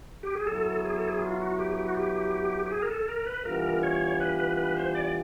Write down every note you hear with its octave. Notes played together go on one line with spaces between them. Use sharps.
G4
G#4
F#3 B3 E4 A4
G#4
A4
G#4
F4
F#4
G4
G4
F#4
G4
G4
G#4
A#4
A4
A#4
B4
E3 G3 B3 D4 F4 A#4
C#5
B4
B4
B4
C5
D5